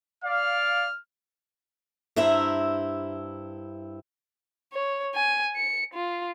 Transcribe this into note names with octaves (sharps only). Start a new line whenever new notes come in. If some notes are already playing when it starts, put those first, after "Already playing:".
D5 F5 F6
G2 E4 C5 E5 A#5
C#5
G#5
C#7
F4